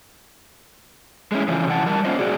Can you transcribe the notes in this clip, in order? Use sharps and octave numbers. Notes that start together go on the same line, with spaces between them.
G#3 A3 C#4 E4
C#3 E3 F3
C3 E3 E4 F#5 A5
G3 A#4 A5
A#3 B3 C#4 F4 C5 D#5
A#2 F#4 G#4 D5